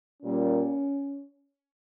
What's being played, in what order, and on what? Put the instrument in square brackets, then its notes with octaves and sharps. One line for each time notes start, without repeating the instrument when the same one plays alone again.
[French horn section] A#2 G3 A#3 C#4